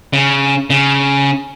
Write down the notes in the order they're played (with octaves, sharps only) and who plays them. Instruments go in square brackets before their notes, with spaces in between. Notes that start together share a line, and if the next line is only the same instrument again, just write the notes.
[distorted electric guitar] C#3
C#3